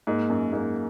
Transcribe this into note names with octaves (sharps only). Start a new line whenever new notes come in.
G#2 A#3
F#2
G#2 A#3